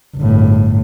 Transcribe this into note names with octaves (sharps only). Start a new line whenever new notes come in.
G1 A2